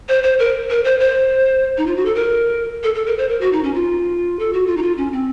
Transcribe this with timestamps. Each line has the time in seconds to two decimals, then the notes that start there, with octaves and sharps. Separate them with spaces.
0.09 C5
0.24 C5
0.39 A#4
0.70 A#4
0.85 C5
1.00 C5
1.78 D#4
1.87 F4
1.96 F#4
2.05 A4
2.15 A#4
2.83 A4
2.95 A4
3.06 A#4
3.18 C5
3.29 A#4
3.41 F#4
3.53 D#4
3.64 C#4
3.75 F4
4.39 A4
4.53 F#4
4.67 F4
4.77 D#4
4.82 F4
4.98 C#4
5.13 C4